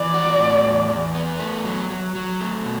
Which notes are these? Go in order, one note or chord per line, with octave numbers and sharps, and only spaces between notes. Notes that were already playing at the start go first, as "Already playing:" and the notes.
Already playing: E3 D5
F#4
A2
E2
E2
B3
A3
F#3
F#3
F#3
A3
B2